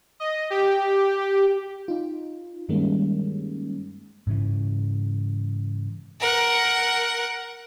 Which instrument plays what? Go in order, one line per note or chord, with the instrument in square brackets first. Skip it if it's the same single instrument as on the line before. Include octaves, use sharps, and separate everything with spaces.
[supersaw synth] D#5
G4
[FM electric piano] D#4 F4
G2 D#3 G3 G#3 A#3 C#4
[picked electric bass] G#2 C#3 E3
[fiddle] A#4 F#5